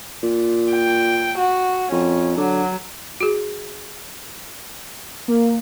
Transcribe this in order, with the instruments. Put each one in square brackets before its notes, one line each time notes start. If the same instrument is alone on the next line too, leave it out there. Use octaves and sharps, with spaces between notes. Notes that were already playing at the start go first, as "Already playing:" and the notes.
[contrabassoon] A#2
[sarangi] G5
F#4
[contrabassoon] F2 [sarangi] C#4
[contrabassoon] D3 [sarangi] F#3
[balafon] F#4 G#4
[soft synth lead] A#3